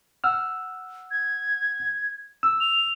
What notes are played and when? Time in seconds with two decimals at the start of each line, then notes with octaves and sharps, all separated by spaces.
0.24 F#5 E6 F6
1.11 G#6
2.43 E6
2.60 F7